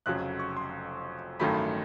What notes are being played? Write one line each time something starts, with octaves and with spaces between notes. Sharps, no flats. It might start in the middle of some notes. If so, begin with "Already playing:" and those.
F1 F2 C#3 F#3 F#6
C#6
C6
A1 G2 D#3 F#3 A3 B5